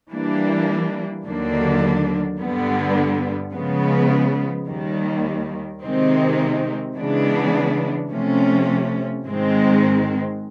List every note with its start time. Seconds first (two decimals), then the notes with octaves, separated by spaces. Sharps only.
0.10 E3 G3 A#3 D4
1.24 D#2 D3 F#3 A#3 D4
2.39 G2 D3 G3 B3
3.53 C#3 F3 G#3 B3
4.67 D#2 D#3 G3
5.82 C3 D#3 G#3 C4 D#4
6.96 C#3 E3 G#3 B3 D4
8.10 C3 F3 A3 C#4
9.24 G#2 D#3 G#3 C4